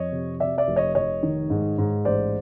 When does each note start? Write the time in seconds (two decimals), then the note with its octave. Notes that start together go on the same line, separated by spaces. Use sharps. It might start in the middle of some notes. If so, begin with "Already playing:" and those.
Already playing: F2 C#5 D#5
0.12 C3
0.40 C3 D5 E5
0.58 D5 E5
0.68 F1
0.76 C#5 D#5
0.95 F1 C#5 D#5
1.23 D#3
1.50 G#2
1.78 G#2
2.05 A1 C5 D5